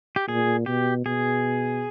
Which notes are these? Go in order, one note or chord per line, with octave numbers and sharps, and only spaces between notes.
G4
A#2 G#4
B2 G4
B2 G#4